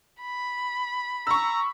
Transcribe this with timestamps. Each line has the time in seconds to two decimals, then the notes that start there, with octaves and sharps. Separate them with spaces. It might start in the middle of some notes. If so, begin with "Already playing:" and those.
0.20 B5
1.27 A#5 C#6 E6